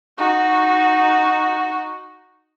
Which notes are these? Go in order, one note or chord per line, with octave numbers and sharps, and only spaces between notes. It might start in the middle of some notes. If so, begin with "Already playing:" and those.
D#4 F#4